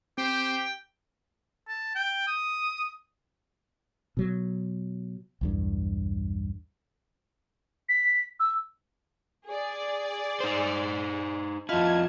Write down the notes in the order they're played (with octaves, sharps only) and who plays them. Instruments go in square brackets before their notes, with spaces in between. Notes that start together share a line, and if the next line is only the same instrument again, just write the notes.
[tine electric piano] C4 [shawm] G4 [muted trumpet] C5 [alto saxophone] G5
[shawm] A5
G5
D#6
[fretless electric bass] B2 F#3
B1 E2 G2
[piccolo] B6
E6
[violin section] G#4 D5
[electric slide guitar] D#4 C5
[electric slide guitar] F2 E4 [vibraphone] F4 D#5 F5 [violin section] A5 G#6